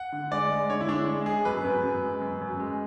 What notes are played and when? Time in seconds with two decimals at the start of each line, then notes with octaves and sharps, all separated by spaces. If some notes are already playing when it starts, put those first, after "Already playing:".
Already playing: F#5
0.12 D3
0.31 G#3 D5
0.50 G#3
0.70 D3 C#5
0.80 E4
0.88 G#3 D4
1.07 G#3
1.26 G#3 G#4
1.45 F#2 B4
1.65 F#2
1.83 F#2
2.03 G#3
2.21 F#2
2.41 F#2
2.60 G#3